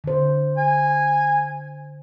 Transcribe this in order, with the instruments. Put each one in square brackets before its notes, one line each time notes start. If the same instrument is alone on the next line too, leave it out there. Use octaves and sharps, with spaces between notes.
[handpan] D3 C5
[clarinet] G#5